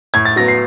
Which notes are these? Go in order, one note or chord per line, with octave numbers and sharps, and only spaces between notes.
A2 G#6
A6
F#3 B3 A#6
C7